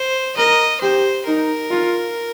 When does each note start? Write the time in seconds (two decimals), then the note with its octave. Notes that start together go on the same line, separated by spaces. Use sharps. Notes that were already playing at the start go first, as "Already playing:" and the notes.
Already playing: C5
0.37 A#4 D#5
0.81 G4 C5
1.27 D#4 A#4
1.71 F4